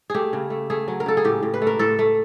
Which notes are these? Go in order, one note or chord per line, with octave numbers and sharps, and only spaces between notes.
A3 G4 G#4
C#3
A3
A3 G#4
F#3
A#4
C#3 A4
G#4
A2 G4
A2
B4
A3
A#4
A2 A4
A3